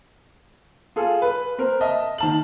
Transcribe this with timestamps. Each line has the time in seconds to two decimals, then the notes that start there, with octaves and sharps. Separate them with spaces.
0.96 F4 G#4 A4
1.22 B4
1.58 C4 A#4
1.81 D#5 E5 A5
2.18 D#3 A5 F#7